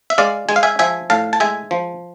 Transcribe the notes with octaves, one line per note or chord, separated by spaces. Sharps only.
E5
G#3 D5 F5
G#3 G#5
F5
E5 G#5
F3 E5 G#5
A2 F5 A5
A5
G#3 E5 G#5
F3